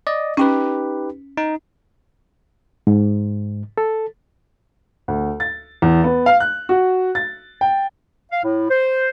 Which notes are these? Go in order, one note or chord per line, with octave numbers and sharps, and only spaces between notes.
D5 D#5
C#4 D#4 G4 B4
D#4
G#2
A4
D2
A6
E2
B3
F5
F#6
F#4
A6
G5
F5
A2
C5